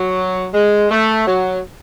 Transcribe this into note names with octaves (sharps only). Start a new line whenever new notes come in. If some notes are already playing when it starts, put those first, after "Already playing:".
Already playing: F#3
G#3
A3
F#3